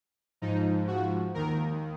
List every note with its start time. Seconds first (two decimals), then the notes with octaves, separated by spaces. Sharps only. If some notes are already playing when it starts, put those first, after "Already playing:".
0.42 G#2 F3 D#4
0.88 F#4
1.34 D#2 D#3 A#4